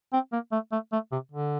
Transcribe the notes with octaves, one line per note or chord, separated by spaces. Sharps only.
C4
A#3
A3
A3
A3
C3
D3